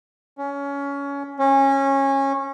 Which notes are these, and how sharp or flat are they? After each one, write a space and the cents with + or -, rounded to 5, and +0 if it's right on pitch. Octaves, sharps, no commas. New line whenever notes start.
C#4 +20
C#4 -20